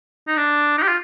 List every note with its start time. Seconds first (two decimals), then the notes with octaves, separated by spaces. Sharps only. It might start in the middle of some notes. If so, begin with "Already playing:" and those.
0.27 D#4
0.37 D4
0.78 D#4
0.83 G4
0.88 F4